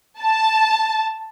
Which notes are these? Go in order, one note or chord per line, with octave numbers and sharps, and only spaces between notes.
A5